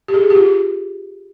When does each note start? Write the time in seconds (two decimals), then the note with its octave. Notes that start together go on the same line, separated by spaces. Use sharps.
0.08 G4
0.14 G#4
0.30 G4
0.35 F4